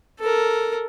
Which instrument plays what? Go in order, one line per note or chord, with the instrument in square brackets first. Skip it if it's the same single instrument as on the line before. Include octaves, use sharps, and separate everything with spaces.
[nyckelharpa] A4 A#4